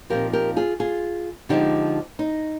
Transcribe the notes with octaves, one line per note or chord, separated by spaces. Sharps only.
A#2 F3 C4 D#4 G4 A#4
G4 A#4
F4 G#4
F4 G#4
D3 F3 G#3 D#4 G4
D#4